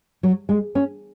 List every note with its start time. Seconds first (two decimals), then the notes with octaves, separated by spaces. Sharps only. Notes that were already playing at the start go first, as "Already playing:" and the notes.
0.23 F#3
0.49 G#3
0.75 C#4